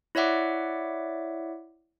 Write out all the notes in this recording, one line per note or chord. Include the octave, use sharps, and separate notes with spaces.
E4 C#5 D5 E5 F#5 D6